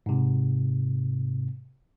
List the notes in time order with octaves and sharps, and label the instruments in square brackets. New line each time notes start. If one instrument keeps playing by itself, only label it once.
[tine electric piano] G#2 C3